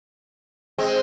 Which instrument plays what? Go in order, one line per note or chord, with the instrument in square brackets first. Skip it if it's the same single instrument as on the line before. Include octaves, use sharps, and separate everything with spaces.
[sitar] G#3 C4